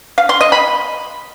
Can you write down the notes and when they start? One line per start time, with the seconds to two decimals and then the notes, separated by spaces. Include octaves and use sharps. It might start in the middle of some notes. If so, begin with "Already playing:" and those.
0.18 F5
0.29 C6
0.41 D#5
0.52 B5